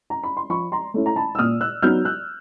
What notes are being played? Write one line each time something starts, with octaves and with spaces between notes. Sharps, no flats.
A#5
B5
C6
F3 B5 C#6
A#5 C6
A3 C#4 E4
A#5
A5 B5
E6
A#2 D#6 F6
E6 F#6
F#3 B3 D#4 F6 G6
E6 F#6